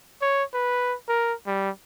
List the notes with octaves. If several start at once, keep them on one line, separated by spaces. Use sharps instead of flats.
C#5
B4
A#4
G3